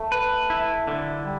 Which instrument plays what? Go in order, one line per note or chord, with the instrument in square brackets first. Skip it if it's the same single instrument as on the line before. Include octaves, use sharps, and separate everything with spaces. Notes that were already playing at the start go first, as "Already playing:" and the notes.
Already playing: [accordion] A3
[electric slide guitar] B4
E4
D3
[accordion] G3